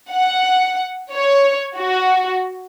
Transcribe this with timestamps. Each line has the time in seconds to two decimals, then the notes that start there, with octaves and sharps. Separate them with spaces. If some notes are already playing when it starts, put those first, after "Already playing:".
0.10 F#5
1.13 C#5
1.78 F#4